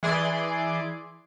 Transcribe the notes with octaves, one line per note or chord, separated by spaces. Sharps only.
E3 E4 G#4 D5 C6 D7